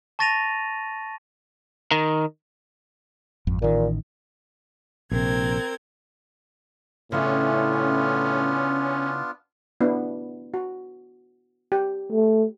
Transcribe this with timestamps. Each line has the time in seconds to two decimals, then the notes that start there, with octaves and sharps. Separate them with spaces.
0.19 A5 C#6 A6 A#6 D#7 F7
1.91 D#3
3.47 G#1 F2
3.62 A1 A#2 D#3
5.12 A#1 C3 C4 A#4 G#6
7.12 A2 C#3 B3 C#4 D4 E4 F4
9.81 B3 D4 E4
10.54 F#4
11.72 G4
12.12 A3